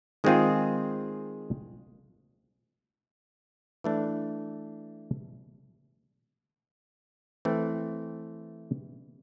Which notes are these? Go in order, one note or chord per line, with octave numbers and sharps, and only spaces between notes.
D#3 G#3 C4 F4 G#4
E3 A3 D4
E3 A3 C4